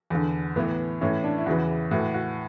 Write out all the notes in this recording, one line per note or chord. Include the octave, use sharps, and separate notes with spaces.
E2 D3
A2 E3 B3
A2 E3 C#4
D4
E4
E2 C#3 E3 F#4
A2 E3 F#4
F#4